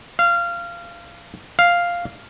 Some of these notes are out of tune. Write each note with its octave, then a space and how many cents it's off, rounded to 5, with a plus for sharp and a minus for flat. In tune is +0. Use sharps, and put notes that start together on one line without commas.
F5 -20
F5 +0